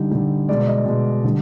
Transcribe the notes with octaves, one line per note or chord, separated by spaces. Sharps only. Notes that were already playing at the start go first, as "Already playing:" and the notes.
Already playing: D3 G3 D#4
D3 G3
B2 G#3 D5
D#5
B2 G#3
D3 G3